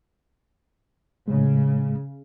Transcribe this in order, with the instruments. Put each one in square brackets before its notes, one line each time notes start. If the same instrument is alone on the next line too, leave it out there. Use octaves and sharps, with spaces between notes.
[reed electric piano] A2 G#3 [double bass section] C#3